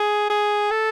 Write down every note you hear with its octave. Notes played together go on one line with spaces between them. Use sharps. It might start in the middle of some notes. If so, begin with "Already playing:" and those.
Already playing: G#4
G#4
A4